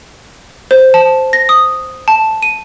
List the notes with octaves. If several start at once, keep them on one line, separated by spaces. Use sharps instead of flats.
C5
A5
A#6
D#6
A5
D#7